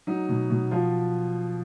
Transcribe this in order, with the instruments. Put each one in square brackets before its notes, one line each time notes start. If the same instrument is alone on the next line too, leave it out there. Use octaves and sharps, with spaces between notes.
[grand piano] F#3 D#4
B2
B2
F3 F4